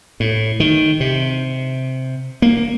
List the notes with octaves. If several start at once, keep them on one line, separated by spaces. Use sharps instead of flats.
A2
D#3
C3
A#3